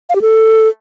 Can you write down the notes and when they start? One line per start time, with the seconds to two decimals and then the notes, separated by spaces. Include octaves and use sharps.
0.09 F5
0.15 G4
0.22 A4